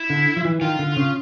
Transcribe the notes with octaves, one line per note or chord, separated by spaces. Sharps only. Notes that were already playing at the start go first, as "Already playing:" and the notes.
Already playing: E4
D3
F3
E3
D#3 F4
D3
C#3